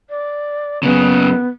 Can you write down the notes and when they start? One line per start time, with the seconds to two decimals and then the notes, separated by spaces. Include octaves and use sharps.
0.09 D5
0.83 F#2 C#3 B3